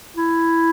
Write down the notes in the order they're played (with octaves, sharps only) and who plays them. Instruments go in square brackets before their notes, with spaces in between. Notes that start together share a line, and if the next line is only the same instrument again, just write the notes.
[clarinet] E4